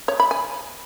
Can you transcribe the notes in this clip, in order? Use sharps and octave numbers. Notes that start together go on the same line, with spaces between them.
C#5
B5
G#5